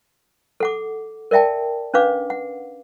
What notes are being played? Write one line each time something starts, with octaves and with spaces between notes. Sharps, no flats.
A4 F#5 D6
A#4 D5 E5 G5 A5
C#4 D4 B4 F5 D6
F#5